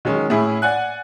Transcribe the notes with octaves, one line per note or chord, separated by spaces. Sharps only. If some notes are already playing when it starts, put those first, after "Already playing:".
D#3 F#3 G#3 C#4
A2 C#4 E4 G#4
D5 F#5 G#5 F#6